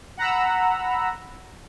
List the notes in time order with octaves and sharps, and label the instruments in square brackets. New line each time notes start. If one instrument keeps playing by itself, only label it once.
[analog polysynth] F#5 A#5 B5 E6